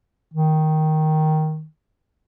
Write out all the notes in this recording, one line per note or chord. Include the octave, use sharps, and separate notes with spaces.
D#3